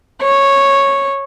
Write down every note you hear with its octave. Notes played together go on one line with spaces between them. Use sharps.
C#5